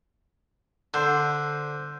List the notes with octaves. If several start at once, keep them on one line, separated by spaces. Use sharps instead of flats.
D3 C5